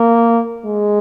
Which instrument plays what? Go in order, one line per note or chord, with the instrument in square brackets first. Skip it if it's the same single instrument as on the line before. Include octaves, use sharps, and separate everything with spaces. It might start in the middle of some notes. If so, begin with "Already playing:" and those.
Already playing: [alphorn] A#3
G#3